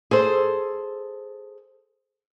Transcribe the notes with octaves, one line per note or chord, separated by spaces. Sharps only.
G#4 A4 C5